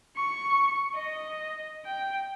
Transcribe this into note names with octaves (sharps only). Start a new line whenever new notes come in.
C#6
D#5
G5